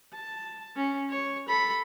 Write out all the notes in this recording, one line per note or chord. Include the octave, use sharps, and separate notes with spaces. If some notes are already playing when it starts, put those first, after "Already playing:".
A5
C#4
C#5
A4 B5